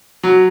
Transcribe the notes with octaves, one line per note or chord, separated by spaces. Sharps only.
F#3